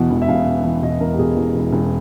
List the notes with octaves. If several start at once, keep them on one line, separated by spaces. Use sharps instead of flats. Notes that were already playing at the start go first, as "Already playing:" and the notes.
Already playing: E2 B2 F#5
E1
E5
E1 F5
B2
E2
E1 D#5
E1 A#4
G4
B2 G#4
E2
E1
E1